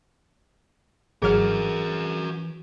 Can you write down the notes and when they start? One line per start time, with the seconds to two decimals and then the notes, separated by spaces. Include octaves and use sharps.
1.22 G#1 E3 F#3 F#4 G#4 A#4 F6